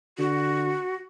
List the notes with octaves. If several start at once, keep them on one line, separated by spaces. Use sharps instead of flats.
D3 F#4